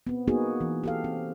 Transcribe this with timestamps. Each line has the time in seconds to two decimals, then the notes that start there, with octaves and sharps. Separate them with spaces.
0.07 B3 C4
0.28 A#3 B3 D#4 F#4 G#4
0.61 E3
0.84 G4 A4 F5
1.04 C4